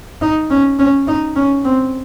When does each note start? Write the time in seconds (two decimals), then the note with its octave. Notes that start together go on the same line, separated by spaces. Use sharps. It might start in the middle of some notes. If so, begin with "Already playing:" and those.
0.22 D#4
0.51 C#4
0.79 C#4
1.08 D#4
1.36 C#4
1.65 C4